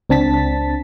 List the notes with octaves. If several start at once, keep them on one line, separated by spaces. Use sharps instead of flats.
C#2 C4 D4 A5 A6 B6